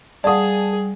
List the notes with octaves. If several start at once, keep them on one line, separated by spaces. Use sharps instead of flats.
G3 G#4 D5 F5 F#5 A5 D#6